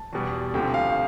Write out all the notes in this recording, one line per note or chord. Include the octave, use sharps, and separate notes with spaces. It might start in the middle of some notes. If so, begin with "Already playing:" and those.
Already playing: A5
E2 B2 G3
D2 C3 F3 G5
F5